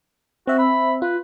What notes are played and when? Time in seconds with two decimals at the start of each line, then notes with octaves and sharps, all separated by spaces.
0.47 C4 F#4 E5
0.59 B5
1.02 F4 B4